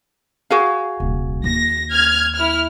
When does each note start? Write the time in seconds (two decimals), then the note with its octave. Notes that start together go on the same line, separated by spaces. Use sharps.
0.50 F#4 G#4 F5
1.00 D#1 C2
1.44 D#2 A#3 A#6
1.91 F6 G#6
2.35 E4 F6